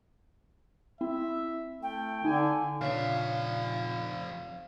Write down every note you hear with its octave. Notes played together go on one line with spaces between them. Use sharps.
C4 E4 E5
A3 G5
D3 D#4 G#5
F2 A#2 C#3 D4 E5 F5